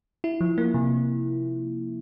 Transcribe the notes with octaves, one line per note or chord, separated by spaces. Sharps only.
E4
F3
A#3
C3